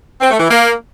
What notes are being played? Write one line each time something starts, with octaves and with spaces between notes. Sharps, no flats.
C4
A3
E3
A#3